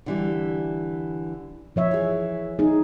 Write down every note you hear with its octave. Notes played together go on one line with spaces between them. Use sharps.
D3 E3 G3
F3 C#5 E5
E3 G#4
D#4 G#4